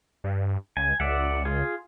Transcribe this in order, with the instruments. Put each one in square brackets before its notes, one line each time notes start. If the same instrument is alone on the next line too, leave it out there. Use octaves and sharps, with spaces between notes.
[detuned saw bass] G2
[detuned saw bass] C#2 [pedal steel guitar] G#5
[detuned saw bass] C#2 [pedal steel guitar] D5 E5 F#5
[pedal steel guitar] F4 G#4